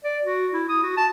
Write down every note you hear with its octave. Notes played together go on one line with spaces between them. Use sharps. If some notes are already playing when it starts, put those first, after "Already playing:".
D5
F#4
E4
D#6
F#4
A5